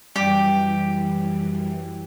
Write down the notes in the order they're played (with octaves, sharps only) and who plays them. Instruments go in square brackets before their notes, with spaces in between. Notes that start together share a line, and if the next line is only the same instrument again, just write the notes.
[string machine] F#2 E3 [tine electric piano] G3 [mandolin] G4